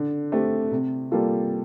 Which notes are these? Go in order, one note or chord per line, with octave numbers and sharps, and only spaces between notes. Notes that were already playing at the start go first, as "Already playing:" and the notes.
Already playing: D3
A3 C4 G4
C3
G3 A#3 F4 A4